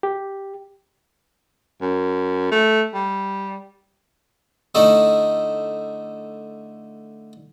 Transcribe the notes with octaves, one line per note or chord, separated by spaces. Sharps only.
G4
F#2
A3
G3
D3 A3 D#4 E4